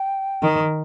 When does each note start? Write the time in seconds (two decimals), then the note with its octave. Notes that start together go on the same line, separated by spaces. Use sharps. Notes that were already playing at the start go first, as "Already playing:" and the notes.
Already playing: G5
0.43 D#3